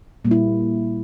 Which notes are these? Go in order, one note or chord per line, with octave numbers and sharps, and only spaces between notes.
A#2 G3 A#3
E4